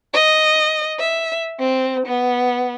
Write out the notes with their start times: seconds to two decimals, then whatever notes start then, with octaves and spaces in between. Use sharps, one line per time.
0.14 D#5
0.99 E5
1.60 C4
2.06 B3